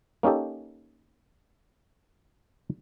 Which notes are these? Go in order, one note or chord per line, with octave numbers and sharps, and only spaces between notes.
A#3 C#4 D#4 G4 A4